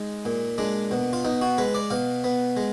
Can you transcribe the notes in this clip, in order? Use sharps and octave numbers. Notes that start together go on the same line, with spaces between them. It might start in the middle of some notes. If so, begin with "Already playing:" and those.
Already playing: G#3 D#4
A#2
G#3 D4
B2
F4
B2 D#4
F#4
G#3 B4
D5
B2 F5
B3
G#3